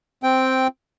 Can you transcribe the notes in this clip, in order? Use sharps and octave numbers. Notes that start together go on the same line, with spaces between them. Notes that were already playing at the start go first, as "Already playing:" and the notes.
C4 G5